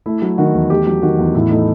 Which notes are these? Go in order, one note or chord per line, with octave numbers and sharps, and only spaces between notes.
A3 E4
F#3
D#3 F#4
E2
A3 G4
F#3
D#3 F#4
E2
A2 E4
A3 D#4